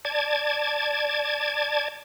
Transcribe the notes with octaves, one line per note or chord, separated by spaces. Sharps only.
D5 A5 G#6